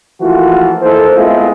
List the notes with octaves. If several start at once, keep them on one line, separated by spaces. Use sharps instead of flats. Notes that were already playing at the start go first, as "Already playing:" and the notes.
E3 F3 A3 A#3 F4 F#4
E3 A#3 D#4 A4 C5
G#3 A3 B3 C4 E4 F4